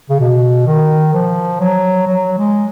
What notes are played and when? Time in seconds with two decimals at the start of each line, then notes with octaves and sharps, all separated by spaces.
0.10 C#3
0.20 B2
0.67 D#3
1.13 F3
1.60 F#3
2.07 F#3
2.38 G#3